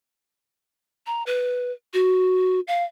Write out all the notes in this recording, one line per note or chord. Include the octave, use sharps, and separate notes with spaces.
A#5
B4
F#4
F5